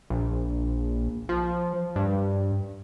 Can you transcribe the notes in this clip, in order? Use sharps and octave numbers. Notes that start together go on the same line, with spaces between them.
A#1
F3
G2